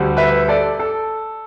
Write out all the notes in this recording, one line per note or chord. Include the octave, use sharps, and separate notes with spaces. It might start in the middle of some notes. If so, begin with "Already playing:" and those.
Already playing: D2 D3 G3
B4 E5
A4 D5
A4